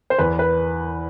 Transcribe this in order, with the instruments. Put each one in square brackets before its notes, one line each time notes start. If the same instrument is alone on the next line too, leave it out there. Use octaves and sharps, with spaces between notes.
[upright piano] C5
[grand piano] E2 [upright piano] B4
[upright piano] B4